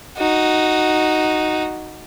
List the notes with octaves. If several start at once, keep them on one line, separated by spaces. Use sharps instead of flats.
D#4 F#4